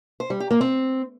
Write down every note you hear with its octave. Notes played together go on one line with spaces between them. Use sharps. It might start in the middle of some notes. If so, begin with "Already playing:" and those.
C5
G3
G4
A#3
C4